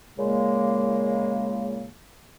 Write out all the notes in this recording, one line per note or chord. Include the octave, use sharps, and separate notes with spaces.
A#2 C#3 G#3 A#3